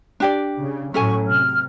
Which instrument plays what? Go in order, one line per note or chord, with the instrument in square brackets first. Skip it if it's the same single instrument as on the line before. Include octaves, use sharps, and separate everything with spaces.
[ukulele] D4 G4 D5
[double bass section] C#3
[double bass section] A2 F#3 [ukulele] C#4 A4 G#5 [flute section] C#6
[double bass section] C3 [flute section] F6